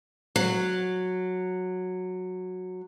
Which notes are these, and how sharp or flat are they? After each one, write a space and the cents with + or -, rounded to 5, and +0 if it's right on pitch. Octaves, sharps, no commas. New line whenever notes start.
F#3 -10